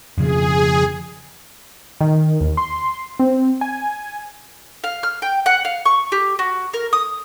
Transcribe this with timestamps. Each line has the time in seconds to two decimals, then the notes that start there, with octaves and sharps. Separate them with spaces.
0.18 F2 C#3 F3 G#4
2.01 D#3
2.41 D#2
2.57 C6
3.20 C4
3.61 G#5
4.84 F5
5.03 F6
5.22 G5
5.46 F#5
5.65 F5
5.86 C#6
6.12 G4
6.39 F#4
6.74 A#4
6.93 D#6